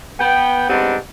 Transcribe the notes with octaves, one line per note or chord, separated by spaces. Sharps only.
B3 G5
G3 G#3 B3 C4 D4 D#4